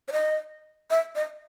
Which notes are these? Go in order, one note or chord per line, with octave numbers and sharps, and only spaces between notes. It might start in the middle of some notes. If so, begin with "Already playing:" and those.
C#5
D#5
E5
D#5